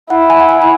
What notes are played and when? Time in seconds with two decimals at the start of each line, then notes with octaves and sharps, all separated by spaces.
0.10 E4 F#5
0.30 G#5
0.40 F#5
0.49 G#5
0.62 G#5